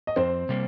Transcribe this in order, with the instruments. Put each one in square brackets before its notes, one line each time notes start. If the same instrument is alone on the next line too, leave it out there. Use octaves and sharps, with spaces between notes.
[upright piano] D#5
[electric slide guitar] F2 [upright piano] C4 C5
[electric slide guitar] C3 G3 A#3